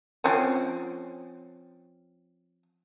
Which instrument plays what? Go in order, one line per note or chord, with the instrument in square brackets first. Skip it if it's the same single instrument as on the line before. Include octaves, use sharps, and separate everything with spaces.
[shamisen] F3 C4 C#4